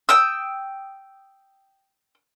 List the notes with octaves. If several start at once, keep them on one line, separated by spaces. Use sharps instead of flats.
G5 D#6 E6